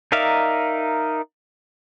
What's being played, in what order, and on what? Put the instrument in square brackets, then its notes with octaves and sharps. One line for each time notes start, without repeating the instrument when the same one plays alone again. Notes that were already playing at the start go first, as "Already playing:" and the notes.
[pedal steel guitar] D#4 A#4 D5 E5 F5